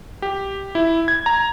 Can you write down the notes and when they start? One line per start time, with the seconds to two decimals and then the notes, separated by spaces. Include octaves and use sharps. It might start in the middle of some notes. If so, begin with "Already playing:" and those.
0.22 G4
0.75 E4
1.08 G#6
1.26 A#5